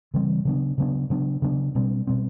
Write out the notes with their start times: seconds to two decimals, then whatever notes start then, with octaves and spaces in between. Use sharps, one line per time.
0.14 C#3 E3 G3 C4
0.45 C#3 F#3 B3 D4
0.78 C#3 F#3 B3 D4
1.10 C#3 F#3 B3 D4
1.42 C#3 F#3 B3 D4
1.75 B2 G3 C4
2.07 B2 G3 C4